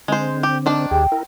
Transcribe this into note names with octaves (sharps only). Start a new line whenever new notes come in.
D3 G#3 C4 C5
G4
D#3 D4 D5
D#2 G4 G#4 G5
E4 A#4